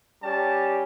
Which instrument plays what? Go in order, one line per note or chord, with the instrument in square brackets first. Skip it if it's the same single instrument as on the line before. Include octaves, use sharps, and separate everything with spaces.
[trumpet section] G3 C#4 G4 A5